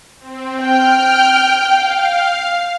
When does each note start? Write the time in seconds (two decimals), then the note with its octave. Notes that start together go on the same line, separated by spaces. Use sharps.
0.19 C4
0.61 G5 F6
1.62 F5